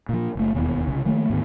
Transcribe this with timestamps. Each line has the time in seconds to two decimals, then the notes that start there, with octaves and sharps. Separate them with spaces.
0.09 A#2 F3
0.35 F#1 A3
0.54 E1 D#2 B3
0.87 C2 C#3
1.05 D#3 F3 A3 A#3
1.30 D2 G#2 D#3 B3